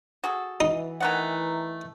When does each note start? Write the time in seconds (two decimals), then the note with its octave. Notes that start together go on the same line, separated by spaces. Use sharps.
0.24 F#4 G#4 A4
0.60 E3 D#4
1.00 D#3 A3 B4 F#5 G#5 A#5